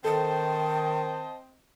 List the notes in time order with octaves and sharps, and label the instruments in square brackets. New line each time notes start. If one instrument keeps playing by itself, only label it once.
[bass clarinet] D#3 [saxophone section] C4 C5 D#5 [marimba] A4 [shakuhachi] A5